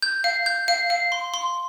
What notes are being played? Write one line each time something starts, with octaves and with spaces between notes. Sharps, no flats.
G6
F5
G6
F5
F5
C6
C6